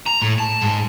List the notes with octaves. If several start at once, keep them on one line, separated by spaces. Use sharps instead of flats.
A#5
A2
A5
G#2